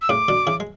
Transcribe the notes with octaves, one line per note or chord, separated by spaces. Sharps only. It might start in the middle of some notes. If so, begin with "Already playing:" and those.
E6
A2 C#3 D6
B2 D3
C#3 E3
G#3